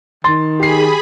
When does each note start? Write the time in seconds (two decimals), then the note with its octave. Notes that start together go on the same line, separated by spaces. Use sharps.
0.24 D#3 C6 A6
0.60 G4 G#4 B5 C7